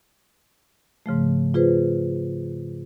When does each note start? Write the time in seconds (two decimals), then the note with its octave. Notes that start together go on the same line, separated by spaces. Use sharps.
1.06 G#2 C#3 F3 A3
1.54 F4 G#4 B4 C5